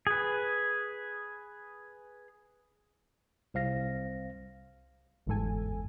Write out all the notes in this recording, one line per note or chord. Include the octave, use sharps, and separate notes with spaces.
G#4 B4
C2 C5 F5 A#6
G1 E2 G#2 A4 G#5